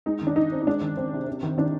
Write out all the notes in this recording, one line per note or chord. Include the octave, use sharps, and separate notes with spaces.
G#3 D#4
D#3
D4
D#3 D#4
C4
D#4
G#3 D4
D#3
D#3 C4
C3
C4
D#3
D#3 D4